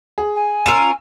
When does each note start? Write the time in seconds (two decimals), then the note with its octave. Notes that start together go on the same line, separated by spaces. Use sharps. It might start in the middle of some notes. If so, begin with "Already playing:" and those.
0.18 G#4
0.35 G#5
0.66 C#4 F4 A#4 E6 E7